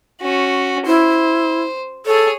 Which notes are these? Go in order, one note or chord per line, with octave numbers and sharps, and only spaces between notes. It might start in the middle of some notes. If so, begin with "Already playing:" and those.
C#4 F#4
E4 C5
G#4 A4 C#5